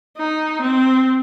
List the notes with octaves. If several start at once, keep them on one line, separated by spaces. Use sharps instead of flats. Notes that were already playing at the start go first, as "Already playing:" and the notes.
D#4
C4